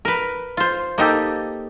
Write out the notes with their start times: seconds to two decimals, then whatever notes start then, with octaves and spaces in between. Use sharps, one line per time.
0.05 A#4 B4
0.57 F4 C5
0.98 A#3 D#4 G4 A4